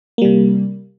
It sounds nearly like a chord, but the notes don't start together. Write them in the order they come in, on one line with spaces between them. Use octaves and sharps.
A#3 G3 C3